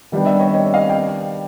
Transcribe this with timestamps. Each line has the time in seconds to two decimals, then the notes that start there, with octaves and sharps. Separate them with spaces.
0.12 D#3 G3 B3 D4
0.26 D5 E5
0.39 C#5 D#5
0.53 C#5 D#5
0.74 D#5 F5
0.90 G5